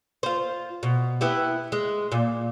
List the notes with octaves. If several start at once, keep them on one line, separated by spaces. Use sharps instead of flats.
F4 C5
B2
B3 E4 G4
G#3
A#2